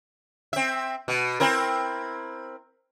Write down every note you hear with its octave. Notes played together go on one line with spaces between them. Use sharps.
C4 E5
B2
C4 E4 A#4